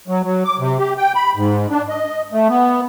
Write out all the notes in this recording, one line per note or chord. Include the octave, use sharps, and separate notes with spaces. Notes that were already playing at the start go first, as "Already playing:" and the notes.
F#3
F#3
D6
C3
G4
G5
B5
G#2
D4
D#5
A3
B3